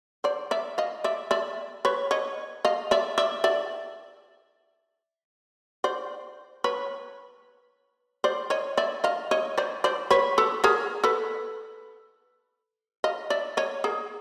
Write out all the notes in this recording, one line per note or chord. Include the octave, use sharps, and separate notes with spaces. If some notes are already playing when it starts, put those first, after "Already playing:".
C5 D5
D5 E5
D#5 F5
D5 E5
D5 E5
B4 C#5
C#5 D#5
D#5 F5
D5 E5
D5 E5
D5 E5
C5 D5
B4 C#5
C5 D5
C#5 D#5
D5 E5
D#5 F5
C#5 D#5
C5 D5
C5 D5
B4 C#5
A4 B4
G#4 A#4
A4 B4
D#5 F5
D5 E5
C#5 D#5
G#4 A#4